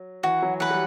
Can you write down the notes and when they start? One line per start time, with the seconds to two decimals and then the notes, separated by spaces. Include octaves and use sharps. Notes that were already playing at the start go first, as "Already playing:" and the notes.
Already playing: F#3
0.23 E3 F#4
0.43 F#3
0.60 E3 B4 F#5
0.70 G3